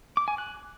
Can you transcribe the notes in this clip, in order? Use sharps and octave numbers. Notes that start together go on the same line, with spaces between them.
D6
G#5
F#6